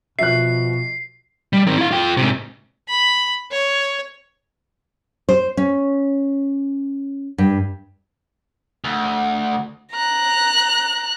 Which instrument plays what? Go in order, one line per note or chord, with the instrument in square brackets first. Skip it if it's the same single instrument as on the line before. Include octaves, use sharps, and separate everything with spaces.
[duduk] B2 [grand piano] F3 F#4 [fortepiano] E5 F#6 [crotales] C7
[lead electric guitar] G3
D#3 C4
E4 F5
F4 G5
G#2 C3
[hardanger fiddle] B5
C#5
[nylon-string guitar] C5
C#4
G2
[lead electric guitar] D2
[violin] A#5 F#6